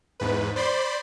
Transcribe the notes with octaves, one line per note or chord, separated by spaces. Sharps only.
E2 G#2 B4
C5 D5 B5 C6